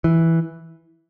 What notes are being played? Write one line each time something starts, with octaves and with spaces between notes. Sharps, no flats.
E3